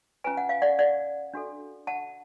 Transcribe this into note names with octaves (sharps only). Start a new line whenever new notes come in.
C#4 F4 B4 G#5
F#5
F5
D5 F#5
D5 F#5
D4 F#4 A4
F#5 A5